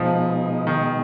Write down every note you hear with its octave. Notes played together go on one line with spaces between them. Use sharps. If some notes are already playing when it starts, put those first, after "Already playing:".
Already playing: B2 F3 G#3 D#4
D#3